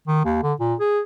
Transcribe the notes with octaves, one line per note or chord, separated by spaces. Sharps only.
D#3
D#2
D3
A#2
G#4